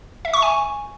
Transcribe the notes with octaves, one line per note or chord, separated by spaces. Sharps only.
E5
C#6
G#5